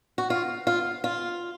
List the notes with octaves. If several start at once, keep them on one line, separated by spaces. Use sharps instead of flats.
F#4
F4
F4
F4